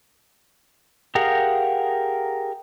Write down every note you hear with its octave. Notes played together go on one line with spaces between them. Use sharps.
G4 G#4 A#4 F5 F#5